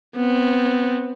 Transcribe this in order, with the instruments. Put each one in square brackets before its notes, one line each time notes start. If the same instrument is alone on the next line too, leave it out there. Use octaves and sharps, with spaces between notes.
[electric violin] B3 C4